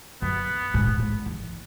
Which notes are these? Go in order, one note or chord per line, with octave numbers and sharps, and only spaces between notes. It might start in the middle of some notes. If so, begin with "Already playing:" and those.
F#2 B3
G#2
A2
G#2
E2